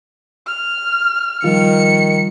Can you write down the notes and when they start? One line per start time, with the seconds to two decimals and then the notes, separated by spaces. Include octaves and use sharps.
0.46 F6
1.44 D#3 F3 G3 F4 C#7